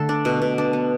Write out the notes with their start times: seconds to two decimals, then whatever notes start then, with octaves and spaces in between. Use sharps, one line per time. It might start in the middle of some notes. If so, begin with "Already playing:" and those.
Already playing: D3 A3 A4
0.09 D4
0.25 B2
0.42 B2
0.58 D4
0.73 B3